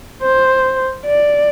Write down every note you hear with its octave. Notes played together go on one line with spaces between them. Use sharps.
C5
D5